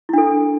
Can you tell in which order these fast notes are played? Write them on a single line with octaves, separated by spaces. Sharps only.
E4 D4 A4